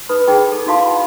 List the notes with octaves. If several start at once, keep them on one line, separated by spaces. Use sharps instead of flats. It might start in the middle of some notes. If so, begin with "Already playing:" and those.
D#4 B4 B5 D#6
D#4 G#4 D5 G5 B5
A4
D#4 E4 F#4 F5 A5 C6
F#5 A5 B5